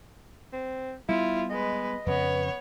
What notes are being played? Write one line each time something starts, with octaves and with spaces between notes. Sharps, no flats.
C4
G3 B3 E4 F4
G#3 B4 D#5
F2 C#3 B3 B4 C#5